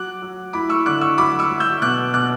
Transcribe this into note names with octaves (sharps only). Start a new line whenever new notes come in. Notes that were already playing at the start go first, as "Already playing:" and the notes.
Already playing: F#3 D6 F#6
F#3
E4 B5 D6
C#6 E6
D3 D6 F#6
C#6 E6
F#3 B5 D6
C#6 E6
F#3
E6 G6
B2 D6 F#6
B2 D6 F#6